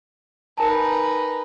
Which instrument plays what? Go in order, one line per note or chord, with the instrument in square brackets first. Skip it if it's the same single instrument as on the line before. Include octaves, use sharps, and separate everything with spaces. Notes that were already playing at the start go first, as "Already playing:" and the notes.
[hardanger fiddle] D#4 B4 [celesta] A#4 G#5 A5